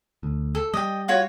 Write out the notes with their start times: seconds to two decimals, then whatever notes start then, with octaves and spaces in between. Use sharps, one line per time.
0.23 D2
0.55 A4
0.74 G3 D#5 G5
1.08 F4 F#4 C#5